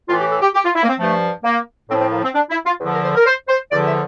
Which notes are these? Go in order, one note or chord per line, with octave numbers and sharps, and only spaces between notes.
A2 E3 F4
G4
A4
G4
G4
F4
E4
A#3
C4
G2 F3 A3
A#3
A2 F3 C4
C4
A#3
C4
D4
E4
F4
E2 D3 F3
A#4
C5
A#4
C5
C5
E2 D3 F3 D5
E5